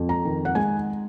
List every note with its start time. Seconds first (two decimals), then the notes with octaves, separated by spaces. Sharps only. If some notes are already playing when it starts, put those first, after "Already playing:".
Already playing: F2
0.09 A#5
0.25 D#3
0.45 F#5
0.55 G#3 G#5